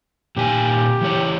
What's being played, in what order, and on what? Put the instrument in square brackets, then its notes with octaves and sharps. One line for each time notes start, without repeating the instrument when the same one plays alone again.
[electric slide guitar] A#2 D#3 G#5 [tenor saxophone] G4
[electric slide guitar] E3 G#3 C#5